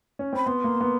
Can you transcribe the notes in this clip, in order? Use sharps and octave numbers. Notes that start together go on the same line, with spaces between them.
C#4
C4 B5
B3 C6
A#3
B3